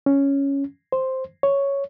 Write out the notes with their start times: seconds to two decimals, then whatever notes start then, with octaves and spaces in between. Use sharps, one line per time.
0.06 C#4
0.92 C5
1.43 C#5